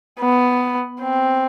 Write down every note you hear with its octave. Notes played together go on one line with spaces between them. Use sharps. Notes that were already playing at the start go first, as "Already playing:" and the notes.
B3
C4